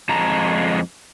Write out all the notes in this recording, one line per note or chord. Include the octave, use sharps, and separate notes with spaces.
F2 G#3 A5 A#5